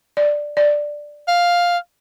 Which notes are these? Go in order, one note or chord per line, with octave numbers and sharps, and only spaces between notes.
D5
D5
F5